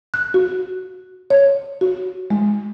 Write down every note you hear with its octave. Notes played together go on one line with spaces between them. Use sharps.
F#6
F#4
C#5
F#4
G#3